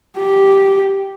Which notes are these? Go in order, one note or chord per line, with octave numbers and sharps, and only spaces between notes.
G4